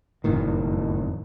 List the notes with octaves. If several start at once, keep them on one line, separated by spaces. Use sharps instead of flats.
F#1 F2 A2 D#3